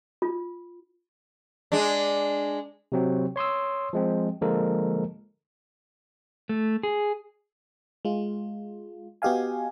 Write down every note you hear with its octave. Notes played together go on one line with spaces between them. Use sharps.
F4
G#3 D4
C3 F#3 C4 F#4
C#5 C6 D#6 E6
F3 G#3 C4
D3 F3 G#3 A#3 A4 A#4
A3
G#4
G#3 F4
B3 F#4 G4 D#5 F5 G#5